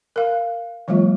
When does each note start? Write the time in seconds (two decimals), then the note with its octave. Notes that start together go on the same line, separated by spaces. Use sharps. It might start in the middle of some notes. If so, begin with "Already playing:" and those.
0.16 A#4 F5
0.88 E3 F#3 G#3 A#3 F4